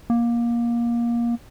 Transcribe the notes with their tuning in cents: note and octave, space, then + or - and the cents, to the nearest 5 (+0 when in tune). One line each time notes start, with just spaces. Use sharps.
A#3 +20